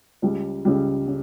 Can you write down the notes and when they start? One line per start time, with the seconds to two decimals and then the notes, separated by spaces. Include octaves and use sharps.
0.22 C#2 C#3 G3
0.65 C#2 C#3 G3
1.07 C#3